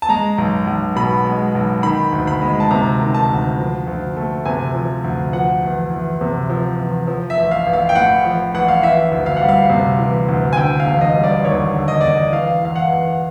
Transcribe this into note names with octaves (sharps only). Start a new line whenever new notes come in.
A5
G#3 A#5
B1
B1
B2 B5
G#3
B1
D#3 B5
D2
B5
G#3
A5
C3 A#5
D#3
A5
D2
F3
D2
A3
C3 G#5
F3
D2
F3 F#5
E2
E2
C3
F3
E2
F3
E5
A1
F5
A1
F5
G5
A2 F#5
F3
A1 F#5
F5
E3 E5
D2
F5
G3 F#5
F5
C3
E3
D2
G#5
D3 G5
F5
E1
D#5
G3
D5
D#2 C#5
D3
D#5
E1 D5
D#5
E3 F5
E2 F5
F#5
E2